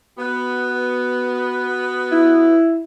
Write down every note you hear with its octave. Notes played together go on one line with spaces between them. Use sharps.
B3 F#4
E4